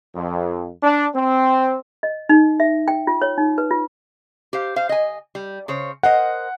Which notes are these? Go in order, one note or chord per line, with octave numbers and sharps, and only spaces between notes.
F2
D4
C4
D#5
D#4
E5
G5
F4
C#5
D#4
B4
F4
G4 C5 F5
C5 F5
D#5 G#5
G3
C#3 C5 C#5
A#4 C5 D#5 F#5